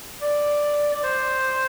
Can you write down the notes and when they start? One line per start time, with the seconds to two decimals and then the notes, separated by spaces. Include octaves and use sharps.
0.22 D5
0.94 D5
1.04 C5